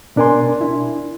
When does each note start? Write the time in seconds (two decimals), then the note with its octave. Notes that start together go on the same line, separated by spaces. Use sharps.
0.16 B2 D4 A#4 G#5 C6
0.61 D4 E4